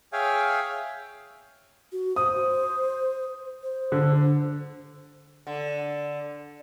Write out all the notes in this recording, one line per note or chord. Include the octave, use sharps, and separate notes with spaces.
G#4 C#5 E5 F5 G5 G#5
F#4
C5 D#6
C5
D3
D3